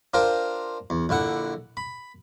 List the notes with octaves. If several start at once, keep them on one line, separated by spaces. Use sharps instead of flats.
D4 F4 A#4 C5 G5
E2
A#1 D3 E4 F#5
B5